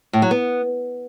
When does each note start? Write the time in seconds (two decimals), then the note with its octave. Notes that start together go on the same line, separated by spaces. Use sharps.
0.13 A2
0.22 F#3
0.31 B3